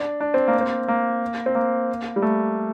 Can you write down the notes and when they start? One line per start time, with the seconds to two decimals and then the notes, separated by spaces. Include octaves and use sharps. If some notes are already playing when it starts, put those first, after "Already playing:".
Already playing: D4
0.21 D4
0.34 C4
0.48 A#3
0.61 C4
0.88 A#3
1.46 C4
1.55 A#3
2.16 G3
2.22 A3